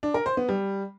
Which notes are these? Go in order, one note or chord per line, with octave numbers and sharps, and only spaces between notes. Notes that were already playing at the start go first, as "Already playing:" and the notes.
D4
A#4
C5
B3
G3